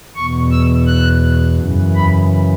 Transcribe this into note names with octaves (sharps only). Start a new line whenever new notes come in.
E2 B2 C#6
E6
F#6
F#2 C#3 E3
B5